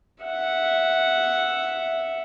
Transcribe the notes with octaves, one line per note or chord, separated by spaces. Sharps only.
E5 F#5